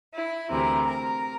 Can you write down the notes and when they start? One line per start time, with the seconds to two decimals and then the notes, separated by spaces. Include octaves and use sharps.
0.13 E4
0.49 D2 C3 E3 A#4
0.85 A#4